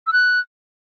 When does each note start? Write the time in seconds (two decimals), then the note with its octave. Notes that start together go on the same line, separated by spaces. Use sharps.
0.07 E6
0.13 F#6